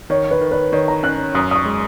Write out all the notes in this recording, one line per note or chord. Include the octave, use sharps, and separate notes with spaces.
D#3 C#5
B4
D#3
B4
D#3 C#5
A#5
C#4 F#6
F#2 D#6
D#6
C#6
G#3